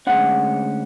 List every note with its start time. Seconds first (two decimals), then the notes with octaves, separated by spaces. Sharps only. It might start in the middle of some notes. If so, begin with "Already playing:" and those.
0.07 D2 D3 G#3 C#4 F#5